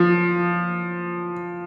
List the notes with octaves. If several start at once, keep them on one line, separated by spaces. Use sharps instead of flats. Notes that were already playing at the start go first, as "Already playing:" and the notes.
Already playing: F3